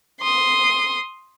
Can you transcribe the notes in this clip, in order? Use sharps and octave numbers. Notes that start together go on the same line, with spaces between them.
C6 D#6